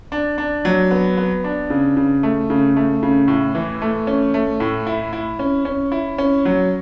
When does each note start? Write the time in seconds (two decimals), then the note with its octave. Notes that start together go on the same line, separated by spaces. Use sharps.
0.12 D4
0.38 D4
0.65 F#3
0.91 B3
1.17 B3
1.44 D4
1.70 C#3
1.97 C#3
2.23 A3
2.50 C#3
2.76 A3
3.03 C#3
3.28 A2
3.55 E3
3.82 A3
4.07 C#4
4.34 A3
4.60 A2
4.87 E4
5.13 E4
5.39 C#4
5.65 C#4
5.92 E4
6.18 C#4
6.45 F#3